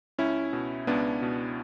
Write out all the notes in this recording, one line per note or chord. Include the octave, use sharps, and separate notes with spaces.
C#2 C#4 E4
B2
C#2 B3 D4
B2